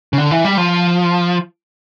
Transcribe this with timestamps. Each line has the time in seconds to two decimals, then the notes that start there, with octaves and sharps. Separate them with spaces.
0.13 C#3
0.18 D3
0.31 E3
0.45 G3
0.58 F3